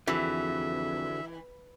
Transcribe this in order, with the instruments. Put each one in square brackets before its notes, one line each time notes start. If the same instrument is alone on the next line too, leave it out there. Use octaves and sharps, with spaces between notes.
[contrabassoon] F2 [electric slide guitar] D3 F#4 G#4 [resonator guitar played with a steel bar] E3 [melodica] E5